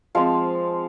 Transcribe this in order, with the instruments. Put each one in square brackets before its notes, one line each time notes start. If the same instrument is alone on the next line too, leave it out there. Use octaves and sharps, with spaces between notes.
[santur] F3 G#3 C4 F5